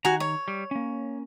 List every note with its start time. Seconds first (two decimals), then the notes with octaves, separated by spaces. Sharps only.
0.05 D#3 F#4 G#5 A#5
0.20 C#5
0.48 G3
0.71 A#3 C#4